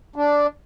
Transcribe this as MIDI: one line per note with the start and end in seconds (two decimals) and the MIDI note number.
0.16 0.47 62